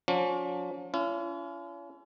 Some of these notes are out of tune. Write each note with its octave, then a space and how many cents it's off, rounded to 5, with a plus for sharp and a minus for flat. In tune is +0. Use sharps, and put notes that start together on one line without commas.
F3 +45 C#4 +45
C#4 +35 F4 -45